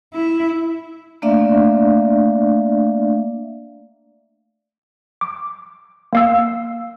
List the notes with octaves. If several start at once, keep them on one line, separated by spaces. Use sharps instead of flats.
E4
A3 A#3 D4 D5 E5 F5
D6
A#3 F5 E6